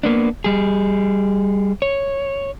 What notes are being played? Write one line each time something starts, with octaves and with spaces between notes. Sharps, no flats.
A#3 B3 D4
G3 G#4
C#5